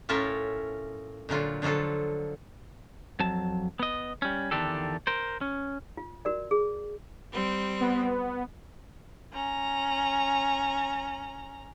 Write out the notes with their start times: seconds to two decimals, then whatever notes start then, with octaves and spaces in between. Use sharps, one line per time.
0.09 A2 C#4 F4 A4 A#4 E5
1.29 A#2 D3 F#3 F4
1.62 D3 F3 F#3 F4 A4
3.20 F2 F#3 A5
3.79 B3 D#5
4.22 G3 C#4
4.51 E2 D3 D#3 D4 G4 A4
5.07 A#4 C5
5.41 C#4
5.97 F4
6.25 F#4 A#4 D5
6.51 G#4
7.32 G3 C4
7.80 B3
9.32 C#4 A#5